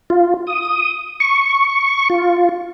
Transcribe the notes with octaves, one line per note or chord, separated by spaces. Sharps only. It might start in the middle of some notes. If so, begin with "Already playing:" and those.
F4
D#6
C#6
F4